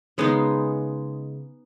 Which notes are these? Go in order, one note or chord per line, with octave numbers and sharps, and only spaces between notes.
C#3 G#3 B3 D#4